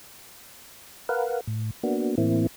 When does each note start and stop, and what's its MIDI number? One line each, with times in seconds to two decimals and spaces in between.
1.09 1.40 70
1.09 1.40 71
1.09 1.40 77
1.09 1.40 78
1.47 1.71 45
1.83 2.15 58
1.83 2.15 59
1.83 2.15 62
1.83 2.15 66
2.18 2.47 45
2.18 2.47 52
2.18 2.47 58
2.18 2.47 60
2.18 2.47 64